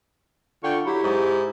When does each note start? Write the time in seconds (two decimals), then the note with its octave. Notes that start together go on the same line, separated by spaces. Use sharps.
0.63 D3 F4 G5 C#6
0.86 F#3 E4 G4
1.03 G#2